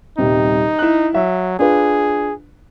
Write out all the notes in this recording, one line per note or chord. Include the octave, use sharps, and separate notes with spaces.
D#1 C3 G3 D#4
E4 F#6
F#3 E5
D4 F4 G#4 B4